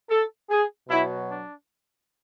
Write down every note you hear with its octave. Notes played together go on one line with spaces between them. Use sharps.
A4
G#4
B2 F#3 E4
D4